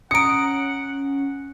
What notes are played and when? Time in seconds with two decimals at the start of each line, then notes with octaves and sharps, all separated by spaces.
0.11 C#4 F#5 A#5 D#6 C#7 D7